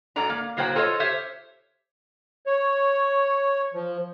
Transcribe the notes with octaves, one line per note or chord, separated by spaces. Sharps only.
G#2 F#3 A4 D5 A#5
A#3
A2 F#3 A#3 C5 G5
F4 A4 C5 C#5 D#5
G4 C5 C#5 E5
C#5
F3